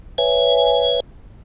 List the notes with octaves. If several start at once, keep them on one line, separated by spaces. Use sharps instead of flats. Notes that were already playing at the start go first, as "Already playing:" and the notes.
B4 C#5 E5 G#5